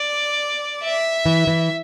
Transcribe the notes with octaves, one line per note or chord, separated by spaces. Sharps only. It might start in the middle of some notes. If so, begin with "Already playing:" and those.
Already playing: D5
E5
E3
E3